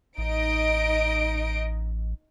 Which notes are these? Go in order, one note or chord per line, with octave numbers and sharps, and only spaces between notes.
A1 D#4 D#5 D7